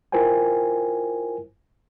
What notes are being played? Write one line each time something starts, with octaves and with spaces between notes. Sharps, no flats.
E4 F4 A#4 C5 G5 G#5